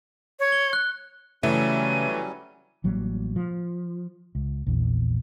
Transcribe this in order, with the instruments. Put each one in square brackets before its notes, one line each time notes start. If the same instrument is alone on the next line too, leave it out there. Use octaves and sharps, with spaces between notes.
[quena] C#5
[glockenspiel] G7
F#6
[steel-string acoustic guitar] C#3 [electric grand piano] E3 A3 E5 [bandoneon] F#3 G3 C#4 [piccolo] D#7
[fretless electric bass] A1 F#3 G3 A#3
F3
C#2
A#1 E2